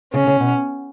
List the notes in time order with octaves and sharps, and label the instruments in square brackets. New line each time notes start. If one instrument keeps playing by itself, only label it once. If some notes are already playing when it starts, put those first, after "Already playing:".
[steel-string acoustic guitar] C#3 [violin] C#4
[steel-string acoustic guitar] C#3
B2